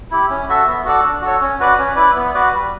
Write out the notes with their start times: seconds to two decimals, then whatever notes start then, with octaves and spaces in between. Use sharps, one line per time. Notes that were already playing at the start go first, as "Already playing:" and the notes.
0.11 E4 G4
0.30 C#4
0.49 F#4 A4 E5
0.67 B3
0.85 F#4 A4 D5
1.03 D4
1.22 F#4 A4 C#5
1.41 C#4
1.60 F#4 B4 D5
1.78 C#4
1.96 E4 B4 D5
2.16 B3
2.34 F#4 B4 D5
2.52 G3